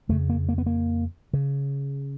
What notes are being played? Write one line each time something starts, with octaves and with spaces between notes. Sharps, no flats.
F2 C#3 A3
A#3
A#3
B3
A#3
C#3